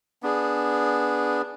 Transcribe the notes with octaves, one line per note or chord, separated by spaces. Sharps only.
B3 D4 G#4